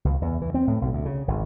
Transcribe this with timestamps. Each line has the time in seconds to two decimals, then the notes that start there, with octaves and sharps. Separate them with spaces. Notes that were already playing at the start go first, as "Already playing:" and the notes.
0.05 C#2
0.22 E2
0.42 E3
0.54 C4
0.67 A2
0.81 B1
0.93 D2
1.05 C#3
1.28 G#1